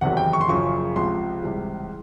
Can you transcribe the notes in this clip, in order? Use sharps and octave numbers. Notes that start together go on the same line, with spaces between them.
F#1 E2 C3 D#3 F#3 F#5
G5
C#6
C6
F#1 F#2 C#3 F3 C#6
C#2 C3 F3 C6
C#2 C3 E3 G3